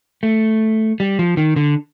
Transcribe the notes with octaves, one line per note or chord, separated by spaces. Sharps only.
A3
G3
F3
D#3
D3